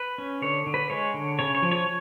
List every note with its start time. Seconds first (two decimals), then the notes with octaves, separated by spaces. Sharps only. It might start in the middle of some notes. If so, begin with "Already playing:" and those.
Already playing: B4
0.18 C#4
0.42 D3 C#5
0.66 D3
0.74 B4
0.90 G#3 C#5
1.14 D3
1.39 C#3 C#5
1.55 C#5
1.62 F3
1.71 C#5